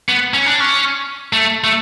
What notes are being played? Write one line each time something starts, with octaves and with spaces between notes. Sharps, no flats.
B3
C#4
D4
C#4
A3
A3